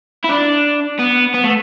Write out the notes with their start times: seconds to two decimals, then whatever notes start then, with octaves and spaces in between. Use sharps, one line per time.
0.24 E4
0.29 D4
0.99 B3
1.34 B3
1.44 A3